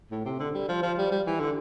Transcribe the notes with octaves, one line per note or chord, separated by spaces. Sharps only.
A2
C3
D3
G3
F3
F3
G3
G3
E3
D3